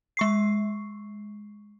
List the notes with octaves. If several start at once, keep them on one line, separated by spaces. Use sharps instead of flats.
G#3 C#6 C7